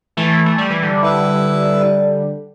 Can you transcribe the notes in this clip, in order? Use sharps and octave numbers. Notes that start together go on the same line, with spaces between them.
E3 A3
A3
G3
E3
D3 G3
E4 B4 E5